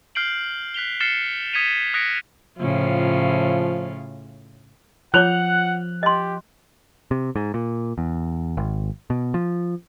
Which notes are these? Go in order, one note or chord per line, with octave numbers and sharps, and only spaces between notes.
F6 G6 C7 D7 F#7
F#6 B6 F7 G7
F6 A6 C7 C#7 E7 G7
D#6 G#6 B6 C#7 D#7 F7
D#6 F#6 A#6 B6 C#7 D7
A2 C#3 F3 F4
F3 F4 C#5 F#5 D6 F#6 F7
G4 D#5 C6
C3
G#2
A#2
E2
G#1
B2
F3